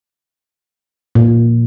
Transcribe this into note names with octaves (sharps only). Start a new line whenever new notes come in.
A#2